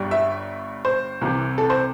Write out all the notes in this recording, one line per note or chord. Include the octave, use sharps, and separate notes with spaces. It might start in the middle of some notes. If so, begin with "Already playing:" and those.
Already playing: G1 G2 G3
E5
C5
C2 C3 E3
A4
C5